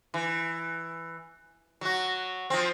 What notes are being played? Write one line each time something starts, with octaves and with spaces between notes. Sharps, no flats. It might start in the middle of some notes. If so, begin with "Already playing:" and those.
E3
F#3 F#4
F3 C4